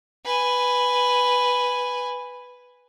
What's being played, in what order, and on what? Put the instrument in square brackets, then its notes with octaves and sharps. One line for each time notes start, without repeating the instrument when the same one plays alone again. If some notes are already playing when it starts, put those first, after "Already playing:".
[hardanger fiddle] B4 G#5